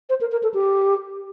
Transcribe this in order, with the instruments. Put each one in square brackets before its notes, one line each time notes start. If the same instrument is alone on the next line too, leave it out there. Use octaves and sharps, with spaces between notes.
[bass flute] C5
A#4
A#4
A4
G4